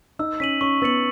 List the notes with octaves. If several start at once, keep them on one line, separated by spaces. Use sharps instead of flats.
D#4 E6
C#4 B6 D#7 F#7
C#4 C#6
B3 E6 A6 C#7 F#7